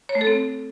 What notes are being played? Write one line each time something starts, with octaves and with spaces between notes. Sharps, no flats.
C#5
A3
A4
C4